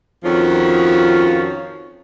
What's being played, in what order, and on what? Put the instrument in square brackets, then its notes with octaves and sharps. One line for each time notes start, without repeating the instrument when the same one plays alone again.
[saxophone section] F2 D#3 F3 C#4 F4 F#4